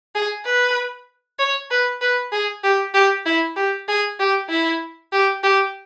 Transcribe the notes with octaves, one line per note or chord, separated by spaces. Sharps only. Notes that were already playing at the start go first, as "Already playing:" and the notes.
G#4
B4
C#5
B4
B4
G#4
G4
G4
E4
G4
G#4
G4
E4
G4
G4